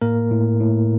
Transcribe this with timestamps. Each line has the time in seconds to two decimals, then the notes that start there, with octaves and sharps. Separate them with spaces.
0.01 A2 A#3 A#4
0.31 A2
0.60 A2